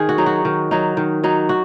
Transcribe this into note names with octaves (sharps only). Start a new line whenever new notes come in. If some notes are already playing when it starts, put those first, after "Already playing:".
Already playing: D#3 G#4
F#4
F#3 D#4
F#4
D#3
F#3 D#4
D#3
F#3 D#4
F#4